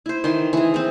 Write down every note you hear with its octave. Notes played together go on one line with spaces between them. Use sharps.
E4 C5
D#3 E3 C6
E3 G#4
E3 C4